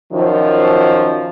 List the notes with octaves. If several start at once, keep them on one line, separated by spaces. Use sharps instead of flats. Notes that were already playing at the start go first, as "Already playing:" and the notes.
F#2 D#3 F3